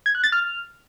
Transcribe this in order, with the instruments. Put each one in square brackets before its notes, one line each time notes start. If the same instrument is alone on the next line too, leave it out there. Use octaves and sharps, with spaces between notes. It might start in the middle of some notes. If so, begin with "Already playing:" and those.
[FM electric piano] G#6
F#6
A6
F6